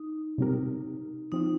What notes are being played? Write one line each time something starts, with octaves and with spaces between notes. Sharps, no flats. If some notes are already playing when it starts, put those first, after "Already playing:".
Already playing: D#4
C3 G3 C4 G4 A#4
F3 C4 D#4 F4